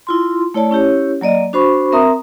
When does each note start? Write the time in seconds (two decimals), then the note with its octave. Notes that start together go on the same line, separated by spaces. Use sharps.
0.07 E4 F4 C6
0.54 A3 E4 C#5 D5 A5
0.71 C#4 E4 G4 C#5
1.21 F#3 A#3 D5 D#5
1.53 D4 F#4 C5 B5 C#6
1.92 C4 A#4 E5 A#5 D#6